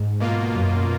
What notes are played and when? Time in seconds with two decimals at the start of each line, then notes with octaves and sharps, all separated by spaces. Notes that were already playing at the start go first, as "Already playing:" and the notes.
Already playing: G#2
0.20 B2 A#3 F4
0.53 F#2